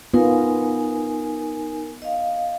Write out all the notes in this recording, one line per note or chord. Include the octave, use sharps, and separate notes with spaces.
B3 D#4 F4 A#4 G#5
D#5 F5